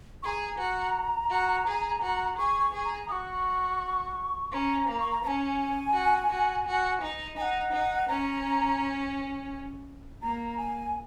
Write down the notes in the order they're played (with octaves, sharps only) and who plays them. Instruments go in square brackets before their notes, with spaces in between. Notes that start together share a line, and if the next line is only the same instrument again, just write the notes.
[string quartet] G#4 [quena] A#5 C#6
[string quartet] F#4
F#4
G#4
F#4
[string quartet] G#4 [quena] C#6
[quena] C#6
[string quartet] G#4
[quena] A#5
[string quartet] F#4 [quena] C#6 D#6
[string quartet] C#4 [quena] A#5 C#6
[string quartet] A#3
[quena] C#6
A#5
[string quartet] C#4 [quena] G#5 A#5
[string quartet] F#4
F#4
F#4
D#4
[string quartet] D#4 [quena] G#5
[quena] F#5
[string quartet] D#4
[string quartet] C#4 [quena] A#5
[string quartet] A#3 [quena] A#5
[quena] G#5